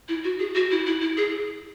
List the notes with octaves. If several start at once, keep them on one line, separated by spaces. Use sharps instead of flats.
E4
F#4
G#4
F#4
E4
E4
E4
G#4